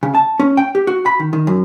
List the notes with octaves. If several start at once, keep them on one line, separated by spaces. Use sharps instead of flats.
C#3
A5
C#4
G5
G4
F#4
B5
D#3
D#3
F#2